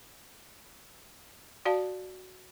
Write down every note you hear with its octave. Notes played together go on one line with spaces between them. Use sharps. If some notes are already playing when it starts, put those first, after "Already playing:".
F#4 D5 F5 A5